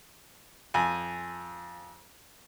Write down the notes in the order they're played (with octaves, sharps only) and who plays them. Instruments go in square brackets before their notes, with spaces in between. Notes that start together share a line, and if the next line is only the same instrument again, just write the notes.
[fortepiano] F2 G#5